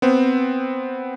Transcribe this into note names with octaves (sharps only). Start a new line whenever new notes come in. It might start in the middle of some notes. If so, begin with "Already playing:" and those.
B3 C4